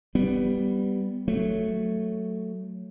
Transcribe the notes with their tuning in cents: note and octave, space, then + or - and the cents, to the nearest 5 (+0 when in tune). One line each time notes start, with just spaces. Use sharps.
G3 +0 B3 +5
F#3 +0 A3 +0